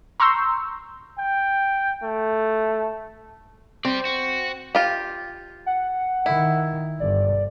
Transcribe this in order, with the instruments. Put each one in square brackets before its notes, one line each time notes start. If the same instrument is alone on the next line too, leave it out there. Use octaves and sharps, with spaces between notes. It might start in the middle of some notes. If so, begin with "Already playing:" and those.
[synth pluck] A#5 C6 C#6 E6 G6
[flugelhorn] G5
A3
[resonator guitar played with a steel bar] C4 [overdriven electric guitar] G4 D5
[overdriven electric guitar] F#4
[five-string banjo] F4 G4
[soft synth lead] F#5
[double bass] D#3 [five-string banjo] E4
[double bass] G1 [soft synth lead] D5